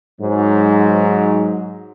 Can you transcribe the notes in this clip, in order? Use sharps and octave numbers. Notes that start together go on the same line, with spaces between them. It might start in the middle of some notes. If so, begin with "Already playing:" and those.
G#2 F#3